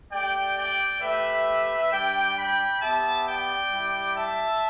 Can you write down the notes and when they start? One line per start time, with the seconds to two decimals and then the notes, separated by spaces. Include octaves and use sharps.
0.12 A3 G4 D5 G5
0.57 D5 G5
1.02 A3 G4 B4 E5
1.92 G3 D4 G4 D5 G5
2.36 G5 B5
2.81 B3 G4 E5 A5
3.26 D5 G5
3.71 G3 E4 G4
4.16 E5 A5